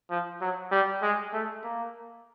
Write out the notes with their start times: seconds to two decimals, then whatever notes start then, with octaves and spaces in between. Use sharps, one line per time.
0.11 F3
0.41 F#3
0.72 G3
1.03 G#3
1.33 A3
1.64 A#3